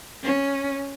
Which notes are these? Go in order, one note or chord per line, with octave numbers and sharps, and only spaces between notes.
C#4